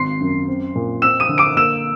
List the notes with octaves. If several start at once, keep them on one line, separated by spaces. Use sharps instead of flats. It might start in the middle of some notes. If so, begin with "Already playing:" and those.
Already playing: G#1 C6 C7
F#2
C4
A#2
C4 E6 E7
D#6 D#7
D3
D6 D7
A#3 E6 E7